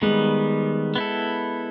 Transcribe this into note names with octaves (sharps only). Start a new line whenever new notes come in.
D#3 G3 G#3 B3
B3 E4 A4